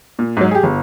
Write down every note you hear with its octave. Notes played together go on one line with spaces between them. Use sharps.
A#2
G#2 F#3
G4 G#4
G1